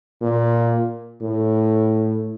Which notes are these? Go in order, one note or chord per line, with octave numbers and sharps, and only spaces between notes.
A#2
A2